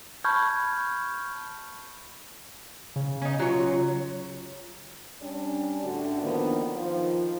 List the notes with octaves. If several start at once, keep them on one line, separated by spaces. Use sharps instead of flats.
A5 B5 C#6 F6 G6 G#6
C#3
C#4 D#4
F#3 F4 C#5
G3 C#4 D4
A2 D3 D4 F#4
D3 D#3 F3 A#3 B3
D#3 F3 F4